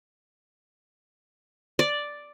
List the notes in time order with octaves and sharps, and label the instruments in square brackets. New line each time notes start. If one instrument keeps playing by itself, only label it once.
[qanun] D5